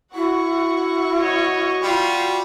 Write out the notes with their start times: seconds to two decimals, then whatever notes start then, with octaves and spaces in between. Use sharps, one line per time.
0.15 E4 F#4 F#5 C#6
1.19 C#5 D#5
1.83 G3 F4